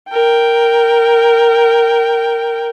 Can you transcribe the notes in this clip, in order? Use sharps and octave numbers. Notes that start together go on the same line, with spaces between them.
A#4 G5